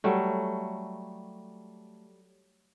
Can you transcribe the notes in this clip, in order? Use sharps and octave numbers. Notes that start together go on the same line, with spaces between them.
F#3 G3 A3